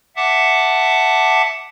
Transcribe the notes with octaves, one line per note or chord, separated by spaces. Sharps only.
E5 F#5 A5 D6